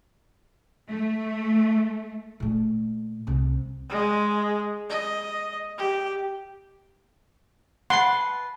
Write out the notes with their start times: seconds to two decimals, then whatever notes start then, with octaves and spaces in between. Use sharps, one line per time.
0.89 A3
2.40 A#2 A3
3.27 C2 C3
3.90 G#3
4.89 D#5
5.78 G4
7.90 B4 F#5 A5 C6